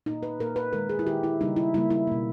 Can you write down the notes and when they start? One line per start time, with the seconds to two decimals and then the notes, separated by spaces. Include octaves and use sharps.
0.06 A#2 A#3 D#4
0.23 B4
0.39 A#2 A#3 A#4
0.56 B4
0.73 D#3 G#3 A#4
0.89 G#4
0.99 E4
1.07 D#3 G#3 G4
1.23 E4
1.40 C#3 G3 A#3 D#4
1.56 E4
1.74 C#3 G3 A#3 E4
1.90 E4
2.07 B2 A#3